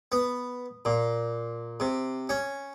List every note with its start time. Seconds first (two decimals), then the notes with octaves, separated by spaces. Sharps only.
0.12 B3
0.85 A#2
1.80 C3
2.29 C#4